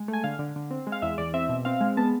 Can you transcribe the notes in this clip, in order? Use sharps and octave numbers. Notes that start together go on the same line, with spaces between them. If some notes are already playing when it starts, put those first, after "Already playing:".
Already playing: G#3
A3
G#5
D3 F5
D3
D3
C4
G#3
F5
E2 E5
E2 D5
C4 E5
B2
C4 F5
G#3
B3 A5